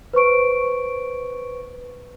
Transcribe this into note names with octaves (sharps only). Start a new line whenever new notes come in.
B4 C5 C#6 D7